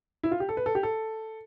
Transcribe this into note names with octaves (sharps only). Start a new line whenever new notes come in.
E4
F4
G4
A4
B4
A4
G4
A4